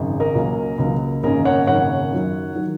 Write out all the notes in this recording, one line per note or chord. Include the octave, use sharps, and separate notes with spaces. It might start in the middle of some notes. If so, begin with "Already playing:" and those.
Already playing: G#1 F#2 C#3 G#3
A#4 D#5
C#2 C#3 F#3 A#3 C#4
C#2 C#3 F#3 A#3 C#4
G#1 F#2 C#3 A#3 C#4 A#4 D#5
C#5 F#5
G#1 F#2 C#3 A#3 C#4 C#5 F#5
F#2 D#3 F#3
D#3 F#3